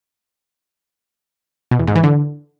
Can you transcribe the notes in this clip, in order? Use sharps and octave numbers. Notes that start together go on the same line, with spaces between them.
B2
E2
G#2
E3
D3